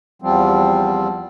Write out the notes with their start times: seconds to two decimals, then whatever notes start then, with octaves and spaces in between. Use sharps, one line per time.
0.22 E2 F3 G3 C4